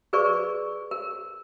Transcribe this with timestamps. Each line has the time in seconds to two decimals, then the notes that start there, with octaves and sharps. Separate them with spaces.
0.13 G#4 A#4 B4 D5 C#6
0.91 A#4